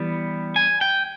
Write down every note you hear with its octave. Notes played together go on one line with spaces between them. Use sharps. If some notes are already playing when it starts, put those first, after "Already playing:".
Already playing: E3 G3 B3
G#5
G5